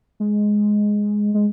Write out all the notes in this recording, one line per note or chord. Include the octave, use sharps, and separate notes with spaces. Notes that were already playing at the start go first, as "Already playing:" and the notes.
G#3
G#3